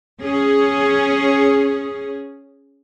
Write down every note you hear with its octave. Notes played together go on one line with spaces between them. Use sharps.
C#4 G#4